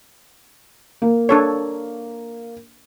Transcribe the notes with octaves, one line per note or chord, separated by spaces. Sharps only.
A#3
D4 A4 C#5